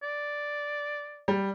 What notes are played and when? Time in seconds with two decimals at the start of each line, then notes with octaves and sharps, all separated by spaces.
0.03 D5
1.28 G3